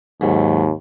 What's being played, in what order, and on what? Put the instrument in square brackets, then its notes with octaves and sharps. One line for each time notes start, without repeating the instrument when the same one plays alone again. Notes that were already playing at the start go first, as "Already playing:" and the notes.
[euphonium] D#2 [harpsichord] G#2 F#3